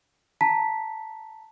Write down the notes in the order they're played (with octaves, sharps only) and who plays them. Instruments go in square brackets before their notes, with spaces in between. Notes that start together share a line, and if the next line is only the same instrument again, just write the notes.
[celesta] A5 A#5 B6